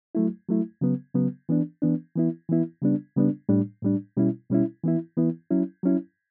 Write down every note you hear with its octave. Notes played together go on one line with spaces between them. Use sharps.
F#3 A3 E4
F#3 A3 E4
C#3 F#3 B3
C#3 F#3 B3
E3 B3 D4
E3 B3 D4
E3 B3 E4
E3 B3 E4
C#3 G3 B3 D4
C#3 G3 B3 D4
A2 G3 D4
A2 G3 D4
B2 G3 C#4 E4
B2 G3 C#4 E4
E3 B3 E4
E3 B3 E4
F#3 C#4 E4
F#3 C#4 E4